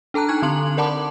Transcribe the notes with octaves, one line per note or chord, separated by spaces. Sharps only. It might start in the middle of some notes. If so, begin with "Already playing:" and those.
D4 A4 A5 A#5 F#6
D#4 G#5 C#6 G#6
D3 C4 C6 F#7
A#4 D5 F#5 A5 B5 D6